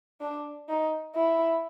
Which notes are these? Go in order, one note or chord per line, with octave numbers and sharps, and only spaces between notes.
D4
D#4
E4